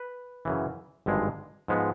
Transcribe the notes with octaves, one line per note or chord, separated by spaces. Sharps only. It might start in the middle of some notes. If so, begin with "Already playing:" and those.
Already playing: B4
F#2 C#3 E3
G#1 G2 D3 F3 G#3
G#2 F3 G#3 B3